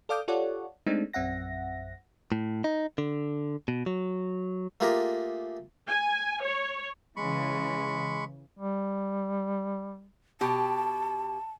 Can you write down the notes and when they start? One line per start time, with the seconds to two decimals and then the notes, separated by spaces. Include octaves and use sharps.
0.09 A4 D5 F5 D6 D#6 G6
0.28 F4 G4 A4 C#5 D5 F#5
0.87 G#3 A3 C4 D4 D#4
1.13 A#1 F#2 C4 E5 F#5 A#6
2.32 A2
2.64 D#4
2.98 D3
3.68 B2
3.86 F#3
4.80 A3 A#3 F4 G4 G#4 A#4
5.88 G#5
6.43 C#5
7.16 C#3 E3 G#3 B5 C#6
8.57 G3
10.41 B2 G4 A5